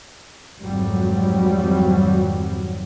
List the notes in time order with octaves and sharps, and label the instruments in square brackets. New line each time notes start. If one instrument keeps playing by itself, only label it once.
[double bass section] G#1 F2 F#3 G3